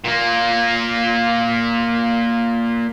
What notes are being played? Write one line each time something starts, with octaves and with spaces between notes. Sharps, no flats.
A#2 A#3